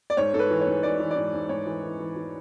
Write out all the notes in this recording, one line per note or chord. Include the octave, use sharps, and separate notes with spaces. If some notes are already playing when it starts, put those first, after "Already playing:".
D5
G#2 C#5
G#2 A4
B4
E3
C#5
G#2
G#2 D5
E3
D5
G#2
G#2
G#2 C#5
E3
E3
E3
E3